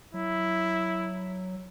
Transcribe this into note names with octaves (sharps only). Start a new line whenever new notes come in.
F#3 E4